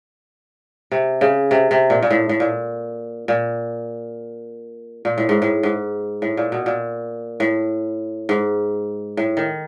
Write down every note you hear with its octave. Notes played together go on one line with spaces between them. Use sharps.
C3
C#3
C3
C3
A#2
A#2
A2
A2
A#2
A#2
A#2
A2
G#2
A2
G#2
A2
A#2
B2
A#2
A2
G#2
A2
D#3